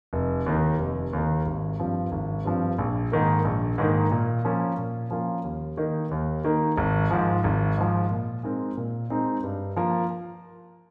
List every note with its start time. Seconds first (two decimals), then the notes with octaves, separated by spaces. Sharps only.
0.13 F1
0.46 D#2 D#3
0.79 F1
1.13 D#2 D#3
1.46 G#1
1.79 G2 F3 C4
2.12 G#1
2.45 G2 F3 C4
2.79 A#1
3.12 G#2 D#3 A#3
3.45 A#1
3.78 G#2 D#3 A#3
4.11 A#2
4.45 F3 A#3 C#4 F4
4.78 A#2
5.11 F3 A#3 C#4 F4
5.44 D#2
5.77 D#3 A#3 D#4
6.11 D#2
6.44 D#3 A#3 D#4
6.78 G#1
7.11 G#2 F3
7.44 G#1
7.78 G#2 F3
8.11 A#2
8.43 G#3 C4 D#4 A#4
8.77 A#2
9.10 G#3 C4 D#4 A#4
9.44 G2
9.76 F3 A#3 F4 A#4